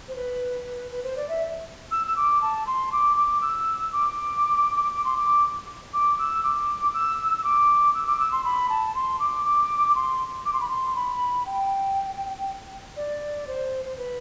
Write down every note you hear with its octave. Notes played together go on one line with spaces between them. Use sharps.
C5
B4
B4
C5
D5
E5
E6
E6
D6
A5
C6
D6
D6
D6
E6
D6
D6
C6
D6
D6
E6
D6
E6
E6
D6
E6
D6
E6
C6
B5
A5
C6
D6
D6
D6
C6
D6
C6
B5
C6
B5
G5
D5
C5
C5
B4